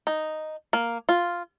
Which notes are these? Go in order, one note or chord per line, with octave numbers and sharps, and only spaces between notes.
D#4
A#3
F4